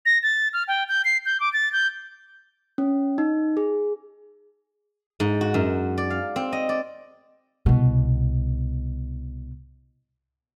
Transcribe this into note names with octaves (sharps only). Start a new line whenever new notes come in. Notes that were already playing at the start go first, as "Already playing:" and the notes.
A#6
A6
F6
G5
G6
C7
G6
D6
A6
G6
C#4
D#4
G#4
G#2
F#4
F#2
D5
F5
C4
D#5
D5
C2 B2